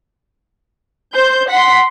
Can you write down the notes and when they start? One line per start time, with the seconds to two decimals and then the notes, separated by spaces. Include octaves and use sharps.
1.15 C5 G6
1.50 F#5 C6 B6